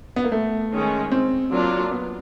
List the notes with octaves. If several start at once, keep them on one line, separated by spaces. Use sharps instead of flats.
B3
A#3
A3
D#3 G#3 C#4
C4
F#3 A#3 D4 F4
B3